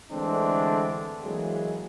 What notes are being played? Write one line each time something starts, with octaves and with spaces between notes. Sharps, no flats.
D3 E3 G#3 A3 C4 D4
E3 F#3 G#3 A#3 G#4